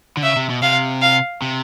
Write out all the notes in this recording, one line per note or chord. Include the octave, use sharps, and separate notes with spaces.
D3
C#3 E5
C3
B2
C3 F5
F5
C3